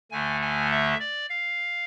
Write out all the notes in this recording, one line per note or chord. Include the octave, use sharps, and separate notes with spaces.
D2 D3 A3 G#5
G#5
E5
D5
F5